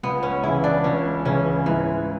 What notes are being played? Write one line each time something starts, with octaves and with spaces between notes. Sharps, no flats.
C#2 B3
C#4
C#3 E3 E4
D4
C#2 C#4
C#3 E3 C#4
G#2 E3